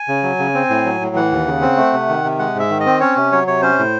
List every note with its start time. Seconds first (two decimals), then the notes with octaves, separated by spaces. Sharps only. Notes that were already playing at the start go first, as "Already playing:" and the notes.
Already playing: G#5
0.08 C#3
0.23 F#3
0.39 C#3
0.55 C4
0.70 A2
0.85 F#3
1.01 A2
1.16 E3 F#5
1.32 D#2
1.46 C#3
1.62 C4
1.77 A3
1.93 C3
2.09 D#3
2.24 C3
2.39 G#3 F#5
2.55 G#2
2.60 E5
2.70 D#3
2.80 D#5
2.86 C4
3.01 C#4 C#5
3.17 C3
3.32 F#3 C#5
3.47 C3 C#5
3.62 C#4 C5
3.79 A2